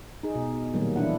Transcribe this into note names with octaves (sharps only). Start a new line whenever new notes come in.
D#4 G#4
B2
A#2 D#3 F#3 G3 A#3
E3 D4 E4 F#5